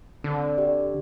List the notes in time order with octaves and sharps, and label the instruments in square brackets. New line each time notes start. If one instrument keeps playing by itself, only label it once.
[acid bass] D3 [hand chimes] C4
[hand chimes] G4 D5